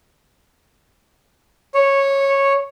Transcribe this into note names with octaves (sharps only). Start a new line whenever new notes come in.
C#5